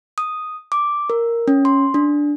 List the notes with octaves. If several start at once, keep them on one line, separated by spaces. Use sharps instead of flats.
D#6
D6
A#4
C#4
C6
D4